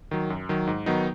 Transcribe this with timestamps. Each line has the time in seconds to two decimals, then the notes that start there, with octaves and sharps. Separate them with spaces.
0.11 D#3 F#3
0.30 F#2
0.49 D#3 F#3
0.67 G#2
0.86 D#3 F#3 B3 D#4